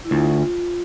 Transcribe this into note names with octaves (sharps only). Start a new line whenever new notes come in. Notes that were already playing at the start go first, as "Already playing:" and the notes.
E4
D2 F4